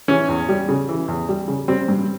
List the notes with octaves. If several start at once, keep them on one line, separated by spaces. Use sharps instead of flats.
E3 C#4
E2
G3
C#3
E3
E2
G3
C#3
G3 C4
G2